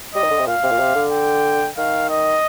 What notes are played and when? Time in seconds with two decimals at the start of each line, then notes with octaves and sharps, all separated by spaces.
0.15 G3 D#5
0.23 D#3
0.30 D3
0.39 C3
0.47 A#2 F5
0.63 C3
0.72 A#2
0.80 C3
0.95 D3
1.12 G5
1.77 D#3 F5
2.10 D#5